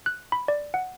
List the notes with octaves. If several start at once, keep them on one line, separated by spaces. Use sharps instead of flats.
F#6
B5
D5
F#5